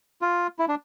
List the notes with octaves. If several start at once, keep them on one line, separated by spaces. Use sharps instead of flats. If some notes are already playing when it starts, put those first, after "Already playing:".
F4
E4
D4